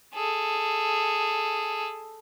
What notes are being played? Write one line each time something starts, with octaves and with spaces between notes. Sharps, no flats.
G#4 A4